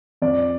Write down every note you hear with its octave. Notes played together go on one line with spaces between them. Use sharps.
F2 D5